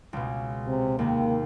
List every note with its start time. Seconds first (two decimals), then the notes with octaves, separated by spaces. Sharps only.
0.13 C#2 B2
0.67 C3
0.99 D#2 C3 A#3